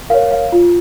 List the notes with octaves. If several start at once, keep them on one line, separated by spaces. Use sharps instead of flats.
A#4 C#5 F5
F5
F4